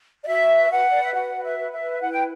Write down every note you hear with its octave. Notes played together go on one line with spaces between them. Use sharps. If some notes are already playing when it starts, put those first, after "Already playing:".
D5
F#4 E5
B4
B4 F#5
B4 D5
E5
F#4 F#5
B4
E5
B4
E5
B4
E4 F#5
G5